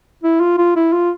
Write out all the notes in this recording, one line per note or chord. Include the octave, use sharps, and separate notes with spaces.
E4
F4
F4
E4
F4